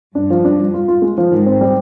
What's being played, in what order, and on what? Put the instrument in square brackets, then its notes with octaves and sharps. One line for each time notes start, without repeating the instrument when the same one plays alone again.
[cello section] G2 [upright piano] D4
[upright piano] F3
D4
F3
F4
F4
G#3
F3
[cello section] G#2 [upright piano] D#3
[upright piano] C4
G3